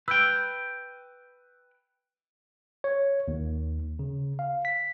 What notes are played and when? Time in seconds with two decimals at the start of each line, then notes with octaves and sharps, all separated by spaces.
0.08 B4 G5 E6 G6
2.84 C#5
3.28 D#2
3.99 C#3
4.39 F5
4.65 B6